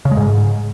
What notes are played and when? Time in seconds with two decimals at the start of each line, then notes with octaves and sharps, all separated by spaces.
0.05 C#3
0.11 G#3
0.17 G#2